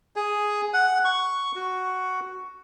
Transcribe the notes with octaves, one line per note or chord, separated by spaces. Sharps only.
G#4
F#5
C#6
F#4